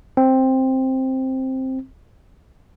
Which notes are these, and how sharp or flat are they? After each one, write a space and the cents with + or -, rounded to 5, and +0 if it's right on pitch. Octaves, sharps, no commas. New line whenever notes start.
C4 +5